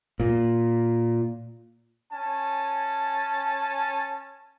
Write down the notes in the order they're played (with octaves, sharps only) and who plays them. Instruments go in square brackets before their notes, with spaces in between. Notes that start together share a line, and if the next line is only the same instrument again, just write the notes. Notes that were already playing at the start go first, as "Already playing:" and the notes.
[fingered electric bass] A#2
[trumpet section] C#4 G#5 A5